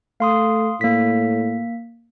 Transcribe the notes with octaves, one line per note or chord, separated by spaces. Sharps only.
A3 F5 C6 D#6
A2 A#3 B6